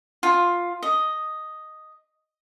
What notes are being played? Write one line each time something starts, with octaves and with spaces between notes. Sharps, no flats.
F4
D#5